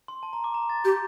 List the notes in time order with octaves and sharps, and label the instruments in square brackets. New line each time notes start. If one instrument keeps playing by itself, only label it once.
[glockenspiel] C6
A5
A#5
D6
A#5
A6
[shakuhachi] G4 [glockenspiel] G6